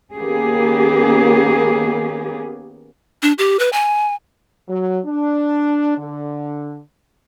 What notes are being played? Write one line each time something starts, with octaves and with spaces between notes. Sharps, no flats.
D#3 A#3 B3 C#4 G4 G#4
D4
G4
B4
G#5
F#3
D4
D3